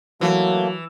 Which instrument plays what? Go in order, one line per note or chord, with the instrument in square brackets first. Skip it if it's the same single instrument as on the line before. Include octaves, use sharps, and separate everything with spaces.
[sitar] E3 [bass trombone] F#3 [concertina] A3 A#3